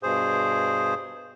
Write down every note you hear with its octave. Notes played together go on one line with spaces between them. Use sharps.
G2 B2 G#4 C5